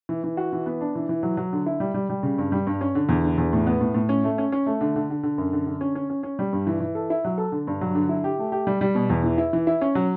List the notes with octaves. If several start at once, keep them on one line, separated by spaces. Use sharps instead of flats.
E3
E3
F#4
E3
B3
D4
E3
E3
F#3
F#3
D3
E4
G3
G3
G3
C#3
G2
G3
G2
C#4
D3
E2
D3
E2
A2
B3
A2
A2
C#4
A3
C#4
C#4
A3
D3
D3
D3
D3
F#2
D3
D3
C#4
C#4
C#4
C#4
G3
G2
E3
E3
A4
E4
F#3
A4
D3
G2
F#3
D3
E4
G4
A3
G4
G3
G3
B2
E2
E3
E4
E3
E4
C#4
F#3